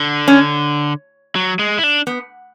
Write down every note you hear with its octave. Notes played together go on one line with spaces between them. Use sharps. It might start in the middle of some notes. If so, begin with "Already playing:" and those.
Already playing: D3
C#4
F#3
G#3
E4
D4
B3